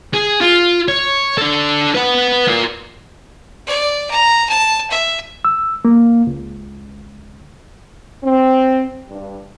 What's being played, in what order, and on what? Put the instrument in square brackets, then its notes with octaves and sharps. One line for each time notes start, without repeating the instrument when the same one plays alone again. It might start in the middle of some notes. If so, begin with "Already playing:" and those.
[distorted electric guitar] G#4
F4
C#5
D4 A4
B4 F#5
F4 A#4
[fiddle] D5
A#5
A5
E5
[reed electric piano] E6
A#3
C#2
[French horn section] C4
G2